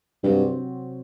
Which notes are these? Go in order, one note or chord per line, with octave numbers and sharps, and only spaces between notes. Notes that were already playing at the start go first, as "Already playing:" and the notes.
G2 C3 F#3 C4 F#4